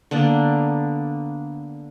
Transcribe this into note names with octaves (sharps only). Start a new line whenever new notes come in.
D3 A#3 B3 D4